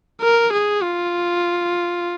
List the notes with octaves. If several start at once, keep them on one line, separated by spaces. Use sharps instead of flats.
A#4
G#4
F4